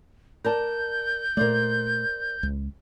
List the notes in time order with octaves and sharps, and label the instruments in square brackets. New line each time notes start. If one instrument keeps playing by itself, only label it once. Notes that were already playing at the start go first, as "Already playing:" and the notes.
[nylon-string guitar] A#4 D5 A5 [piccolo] G6
[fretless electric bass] A#2 A3 [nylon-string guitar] A#4 C5 D5
[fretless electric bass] C#2